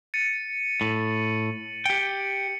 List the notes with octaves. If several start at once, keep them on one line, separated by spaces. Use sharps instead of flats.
A6 C#7 D#7
A2 F#7
G4 G5 C#7 D7